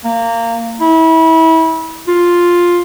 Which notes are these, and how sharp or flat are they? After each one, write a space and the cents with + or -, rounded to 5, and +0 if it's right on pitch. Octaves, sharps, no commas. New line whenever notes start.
A#3 -20
E4 -30
F4 +5